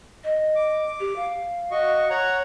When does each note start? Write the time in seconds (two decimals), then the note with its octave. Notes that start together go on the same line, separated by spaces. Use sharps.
0.24 D#5
0.56 D6
1.00 G4
1.16 F5
1.71 F#4 D#5 C#6
2.10 C#5 F#5 A#5